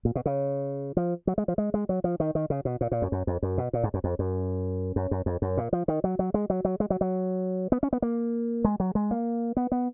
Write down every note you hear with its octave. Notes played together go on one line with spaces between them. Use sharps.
A#2
B2
C#3
F3
F#3
G#3
F3
G#3
G#3
F#3
F3
D#3
D#3
C#3
B2
A#2
A#2
F#2
F#2
F2
F#2
B2
A#2
G#2
F#2
F2
F#2
F#2
F#2
F2
F#2
A#2
F3
D#3
F#3
F#3
G#3
F#3
F#3
G#3
F#3
F#3
B3
C#4
B3
A#3
G#3
F#3
G#3
A#3
B3
B3